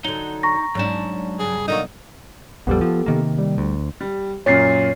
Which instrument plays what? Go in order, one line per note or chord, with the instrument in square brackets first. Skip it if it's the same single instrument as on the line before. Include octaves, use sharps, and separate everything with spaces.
[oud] D3 F#3 [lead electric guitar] D#4 [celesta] G7
[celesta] A#5 C#6 A#6
[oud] G#2 C#4 D4 [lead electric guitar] F#3 A5
[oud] G2 C#3 [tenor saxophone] G#4
[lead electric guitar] B1 [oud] D3 A#3 F#4 [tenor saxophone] D#4
[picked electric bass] A#1 F2 G3 [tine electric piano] B3 G4 A4
[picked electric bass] F3
C3 D#3 A#3
[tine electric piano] G3
[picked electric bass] D2
[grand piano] G3
[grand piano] F#2 A#2 [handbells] C#5 A6 C7